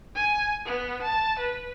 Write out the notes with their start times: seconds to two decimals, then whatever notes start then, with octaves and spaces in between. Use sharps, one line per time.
0.15 G#5
0.65 B3
1.02 A5
1.39 B4